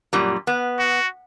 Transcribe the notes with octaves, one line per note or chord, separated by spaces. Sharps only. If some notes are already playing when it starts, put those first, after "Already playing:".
F#2 A#2 G3
B3
F#4